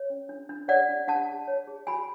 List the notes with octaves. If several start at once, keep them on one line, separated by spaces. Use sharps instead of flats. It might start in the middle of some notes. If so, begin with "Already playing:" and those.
Already playing: C#5
C#4
D4
D4
C#5 D5 F#5
D4
D4 F#5 A5
G#4
C#5
G#4
F#4 G#5 B5